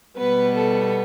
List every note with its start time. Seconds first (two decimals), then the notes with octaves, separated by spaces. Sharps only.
0.18 B2 G3 B3 B4
0.55 A4